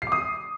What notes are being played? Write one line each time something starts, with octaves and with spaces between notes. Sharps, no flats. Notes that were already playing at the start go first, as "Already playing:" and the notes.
C7
D6
D#6